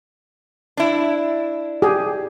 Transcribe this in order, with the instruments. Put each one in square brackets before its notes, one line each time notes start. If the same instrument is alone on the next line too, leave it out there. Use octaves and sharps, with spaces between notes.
[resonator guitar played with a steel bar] D4 E4
[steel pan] G4 G#4